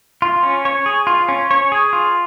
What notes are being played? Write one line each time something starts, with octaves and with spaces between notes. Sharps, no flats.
F4
C#4
C#5
G#4
F4
C#4
C#5
G#4
F4